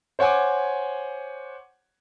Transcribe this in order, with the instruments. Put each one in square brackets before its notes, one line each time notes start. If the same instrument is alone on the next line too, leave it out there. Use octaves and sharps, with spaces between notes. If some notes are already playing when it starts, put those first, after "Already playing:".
[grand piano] C5 C#5 F#5 G#5 D6